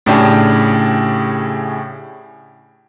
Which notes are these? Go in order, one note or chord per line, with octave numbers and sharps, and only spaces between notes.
A2 C#3 D4 G4 G#4